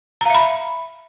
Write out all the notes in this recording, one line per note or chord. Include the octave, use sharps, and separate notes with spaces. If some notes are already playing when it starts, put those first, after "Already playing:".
E5 F5 A#5 B5